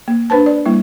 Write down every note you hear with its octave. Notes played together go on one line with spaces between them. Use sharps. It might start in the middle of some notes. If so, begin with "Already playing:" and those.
A#3
D4 B4 C5 A5
D5
G3 A#3 E4